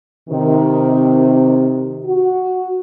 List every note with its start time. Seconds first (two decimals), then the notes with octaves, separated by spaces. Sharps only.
0.29 C3 D#3
2.05 F#4